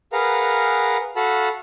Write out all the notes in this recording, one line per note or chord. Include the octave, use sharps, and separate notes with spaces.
G#4 A#4 B4 F5 F#5 A#5
F#4 A4 F5 F#5 A5 B5